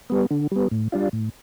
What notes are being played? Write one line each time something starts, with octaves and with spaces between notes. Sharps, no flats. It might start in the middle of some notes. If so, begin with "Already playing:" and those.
G3 B3
D3
G3 B3
A2
G3 D4 F4
A2